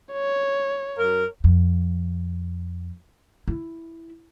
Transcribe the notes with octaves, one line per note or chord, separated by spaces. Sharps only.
C#5
F#2 A#4
F2
E4